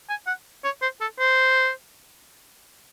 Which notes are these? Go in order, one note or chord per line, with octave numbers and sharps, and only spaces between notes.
G#5
F#5
C#5
C5
A4
C5